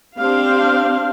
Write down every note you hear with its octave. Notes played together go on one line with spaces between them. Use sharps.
C4 D4 G4 F5